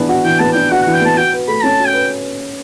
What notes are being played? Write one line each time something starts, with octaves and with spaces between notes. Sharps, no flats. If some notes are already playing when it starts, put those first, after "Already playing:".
Already playing: E3 B3 D4
F#4
E3 G5
B3 A5
D4 G5
F#4 F#5
E3 F#5
G5
B3 A5
F#4 G5
B4
A3 B5
C#4 A5
F#4
G5
B4